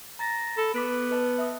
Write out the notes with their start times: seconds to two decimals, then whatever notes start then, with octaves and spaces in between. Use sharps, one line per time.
0.19 A#5 A6 A#6
0.57 A4 B5
0.74 B3 D6 B6 D7
1.11 B4 D#5 A5
1.38 E5 D#6